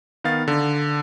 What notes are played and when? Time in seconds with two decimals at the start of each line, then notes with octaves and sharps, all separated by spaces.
0.24 D#3 B3 F5 A6
0.48 D3